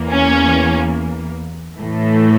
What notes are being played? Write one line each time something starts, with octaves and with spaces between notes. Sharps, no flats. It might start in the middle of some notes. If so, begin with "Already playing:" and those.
Already playing: E2 E3 A#3
C#4
A2 E3 A3